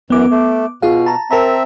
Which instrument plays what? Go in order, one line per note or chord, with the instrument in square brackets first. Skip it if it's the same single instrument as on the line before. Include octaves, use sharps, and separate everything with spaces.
[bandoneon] F#2 E3 [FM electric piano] B3 D6
[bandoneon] A3
[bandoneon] B2 [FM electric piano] F4 G#4 F5
[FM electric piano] A5 A#5
[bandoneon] C4 E5 [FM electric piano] A#4 A5 A#5